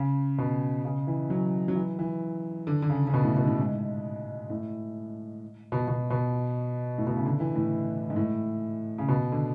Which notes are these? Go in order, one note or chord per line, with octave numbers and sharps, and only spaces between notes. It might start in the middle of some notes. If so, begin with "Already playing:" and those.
Already playing: C#3
B2
C#3
E3
F#3
F#3
E3
E3
D3
D3
C#3
C#3
B2
A2
B2
A2
G#2
A2
B2
B2
B2
A2
B2
C#3
D3
E3
A2
G#2
A2
C#3
B2
D3